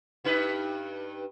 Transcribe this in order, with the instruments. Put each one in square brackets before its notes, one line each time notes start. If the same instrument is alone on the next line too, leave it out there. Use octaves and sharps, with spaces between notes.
[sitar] G2 D#4 B4